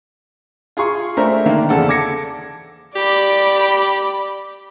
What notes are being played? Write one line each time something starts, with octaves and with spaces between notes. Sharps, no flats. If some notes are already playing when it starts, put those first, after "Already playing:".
F4 G#4 G#5 C6 C#6
A3 C4 D4 A#4 C5 E5
D3 D#3 A#3
E2 C#3 A4 D5 F#5
A5 D6 G#6 A#6 C#7
G4 D5 B5